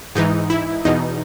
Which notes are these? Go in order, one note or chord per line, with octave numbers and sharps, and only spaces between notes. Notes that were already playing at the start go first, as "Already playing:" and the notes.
G#2 E3 D#4
E4
E2 B2 D#4